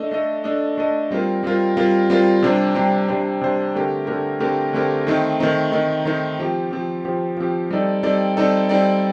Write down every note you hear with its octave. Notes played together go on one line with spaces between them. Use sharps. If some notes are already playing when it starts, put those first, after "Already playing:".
Already playing: A3 D4 A4 D#5
A3 D4 A4 D#5
A3 D4 A4 D#5
A3 D4 A4 D#5
G3 C4 F4 A#4
G3 C4 F4 A#4
G3 C4 F4 A#4
G3 C4 F4 A#4
C3 G3 D4 G4 C5
C3 G3 D4 G4 C5
C3 G3 D4 G4 C5
C3 G3 D4 G4 C5
D3 A3 C4 G4 A#4
D3 A3 C4 G4 A#4
D3 A3 C4 G4 A#4
D3 A3 C4 G4 A#4
D#3 A3 C4 D#4
D#3 A3 C4 D#4
D#3 A3 C4 D#4
D#3 A3 C4 D#4
F3 C4 G4
F3 C4 G4
F3 C4 G4
F3 C4 G4
G3 C4 D#4 A4 D5
G3 C4 D#4 A4 D5
G3 C4 D#4 A4 D5
G3 C4 D#4 A4 D5